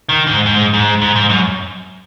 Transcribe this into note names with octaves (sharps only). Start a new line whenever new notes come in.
D#3
G#2
G#2
G#2
G#2
G#2
F#2